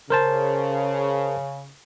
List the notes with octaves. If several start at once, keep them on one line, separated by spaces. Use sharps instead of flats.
C#3 A#4 C5 A5